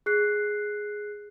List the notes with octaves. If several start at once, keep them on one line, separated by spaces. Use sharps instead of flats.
G#4 F#6 C7